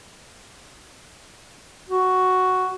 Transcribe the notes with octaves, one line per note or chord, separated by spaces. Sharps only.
F#4